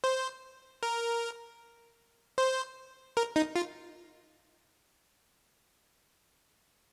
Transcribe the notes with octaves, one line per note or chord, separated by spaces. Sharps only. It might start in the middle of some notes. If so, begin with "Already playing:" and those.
C5
A#4
C5
A#4
D#4
F4